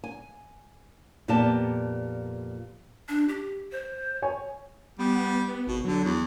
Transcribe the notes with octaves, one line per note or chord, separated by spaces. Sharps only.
G#5
F2 A#2 B3 G4 D5 A5
D4
G4
C5
C#5 G#5
G3 B3
B3
G#1 B2
D3 F#3
E2